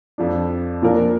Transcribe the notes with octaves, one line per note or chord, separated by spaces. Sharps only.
F2 F3 D4
A#2 F3 D4 A#4